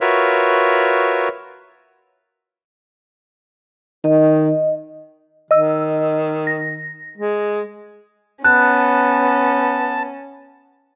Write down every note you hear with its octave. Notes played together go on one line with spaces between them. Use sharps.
F4 F#4 A#4 B4 C#5 E5
D#3 D#5
D#3 D#5 E6
A#6
G#3
B3 C#4 A5 F#6